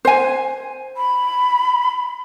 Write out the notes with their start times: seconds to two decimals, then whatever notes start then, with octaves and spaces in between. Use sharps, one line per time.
0.05 C5 G#5
0.97 B5